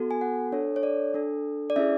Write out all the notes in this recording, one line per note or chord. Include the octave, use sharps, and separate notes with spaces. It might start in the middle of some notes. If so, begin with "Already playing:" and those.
Already playing: B3 F#4 A4
G#5
F#5
D4 A4 C#5
C#5
D5
D4 A4
D5
C#4 E4 G#4 E5